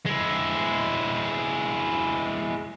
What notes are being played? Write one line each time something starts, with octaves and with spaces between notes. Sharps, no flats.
G#3 E4